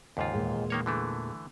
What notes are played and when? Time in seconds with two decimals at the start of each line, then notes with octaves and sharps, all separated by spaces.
0.17 D#2 G#2 C#3 F4
0.33 E2 A#2 G#3
0.70 D#3 A#3 C#5
0.86 D3 E3 A3